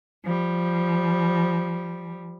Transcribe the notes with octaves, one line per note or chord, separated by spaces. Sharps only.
F3 G3